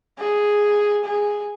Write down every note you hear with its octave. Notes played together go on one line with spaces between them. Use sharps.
G#4
G#4